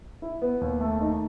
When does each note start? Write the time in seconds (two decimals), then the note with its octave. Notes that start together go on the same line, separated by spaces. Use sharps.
0.22 E4
0.42 B3
0.61 D#2
0.81 A3
1.00 D#4